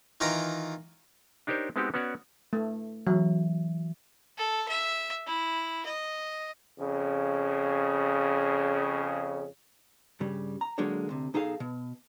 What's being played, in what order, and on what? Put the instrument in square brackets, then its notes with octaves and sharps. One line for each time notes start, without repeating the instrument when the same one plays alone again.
[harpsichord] D#3 E3 F4 D#5 G5 A#5
[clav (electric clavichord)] D4 D#4 G4 A#4 C5 C#5
G#3 B3 C4 D#4 F#4 G4
B3 C#4 F#4 C#5 D5
[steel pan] A3
[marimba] E3 [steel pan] F#3
[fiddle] A4
E5
E4
D#5
[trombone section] F2 C#3
[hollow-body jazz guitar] G2 C#3 G3
A#5
D3 F#3 G#3 A#3 D4 C#5
D2 C3
B1 D#4 G#4 A4 D5 F5
B2